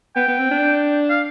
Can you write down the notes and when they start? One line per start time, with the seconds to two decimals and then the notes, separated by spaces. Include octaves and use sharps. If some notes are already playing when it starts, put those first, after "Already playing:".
0.16 B3 G5
0.28 B3
0.39 C4
0.51 D4
1.09 F5